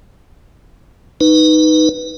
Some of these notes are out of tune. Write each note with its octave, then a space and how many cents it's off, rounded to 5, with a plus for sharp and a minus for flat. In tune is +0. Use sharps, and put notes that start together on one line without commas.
D#4 +0 B4 +0